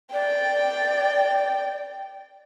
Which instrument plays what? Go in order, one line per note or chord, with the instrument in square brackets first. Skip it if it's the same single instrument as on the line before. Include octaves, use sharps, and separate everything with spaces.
[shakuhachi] D5 [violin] G5